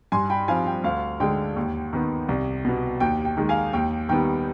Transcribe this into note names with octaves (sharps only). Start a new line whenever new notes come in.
G2 G#5 C6
G5 B5
F3 C4 F5 G#5
G5
D2 F5
D3 G#3 G5
D#2
D#3 B3
C2
B2 B3
D#2 G5
G5
D#3 G#3
F5 G#5
D#2 G5
D#3 G3 B3 G5